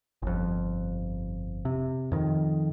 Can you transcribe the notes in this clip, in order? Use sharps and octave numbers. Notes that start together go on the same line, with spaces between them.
G1 F2
C3
F2 D#3